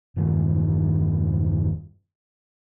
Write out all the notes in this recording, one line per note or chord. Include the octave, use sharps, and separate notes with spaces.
E1 G2 D#3